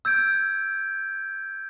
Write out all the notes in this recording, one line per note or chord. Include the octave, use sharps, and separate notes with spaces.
E6 G6 G#6 D7